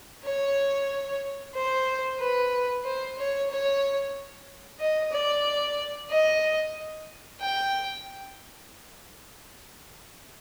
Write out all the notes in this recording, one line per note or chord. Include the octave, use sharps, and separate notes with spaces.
C#5
C5
B4
C5
C#5
C#5
D#5
D5
D#5
G5